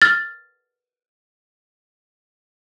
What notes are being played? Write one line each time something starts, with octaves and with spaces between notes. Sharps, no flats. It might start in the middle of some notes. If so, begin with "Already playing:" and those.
F6 A6